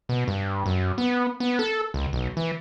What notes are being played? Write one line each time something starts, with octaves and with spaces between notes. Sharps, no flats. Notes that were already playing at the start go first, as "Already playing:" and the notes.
B2
G2
F#2
B3
B3
A4
C#2
B1
E3